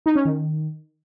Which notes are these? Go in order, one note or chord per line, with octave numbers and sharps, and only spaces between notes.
D#4
C#4
D#3